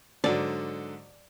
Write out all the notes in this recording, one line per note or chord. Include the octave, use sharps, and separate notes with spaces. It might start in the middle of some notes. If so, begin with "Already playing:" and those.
G#2 D3 F#3 D5